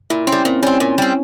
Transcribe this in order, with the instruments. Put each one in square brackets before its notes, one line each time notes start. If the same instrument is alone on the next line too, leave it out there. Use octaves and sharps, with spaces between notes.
[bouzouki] A#2 [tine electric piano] E4
[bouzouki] C4 [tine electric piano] C#4
[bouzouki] G3
[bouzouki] A#2 [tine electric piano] C4
[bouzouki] G3 C4 [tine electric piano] C#4
[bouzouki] A#2
G3 C4